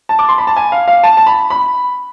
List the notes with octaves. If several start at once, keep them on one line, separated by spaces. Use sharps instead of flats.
A5
D6
C6
B5
A5
G#5
F5
F5
A5
A5
B5
B5